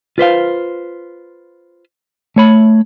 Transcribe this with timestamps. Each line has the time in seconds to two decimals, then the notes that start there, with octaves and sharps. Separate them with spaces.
0.18 F4 B4 C5 F5
2.36 A3 C#5 B5